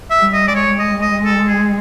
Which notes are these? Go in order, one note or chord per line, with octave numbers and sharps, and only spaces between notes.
E5
G3
D#5
G#3 D5
C#5
D#5
D#5
A4
G#4